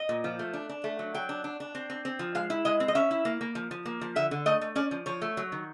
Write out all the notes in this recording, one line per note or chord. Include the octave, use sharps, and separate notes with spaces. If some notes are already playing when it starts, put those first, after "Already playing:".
Already playing: D#5
A#2
F3
A3
D4
D4
A3
F#3
F#3 G5
D4
D4
D4
C4
C4
C4
F3
G#3 F5
E4
G#3 D#5
C4
D#5
C#4 E5
E4
A#3
A#3
F3
F3
A#3
F3
D3 E5
D3
A3 D#5
A3
C#4 D5
F3
F3 C#5
A3
F#3
D#3